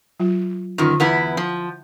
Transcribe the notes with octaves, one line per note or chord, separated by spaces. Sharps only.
F#3 F4
F#2 D3 D#3 F4 C#6
E2 B3 E4
F3